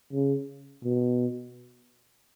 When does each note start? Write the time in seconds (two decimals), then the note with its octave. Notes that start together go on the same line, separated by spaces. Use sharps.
0.13 C#3
0.84 B2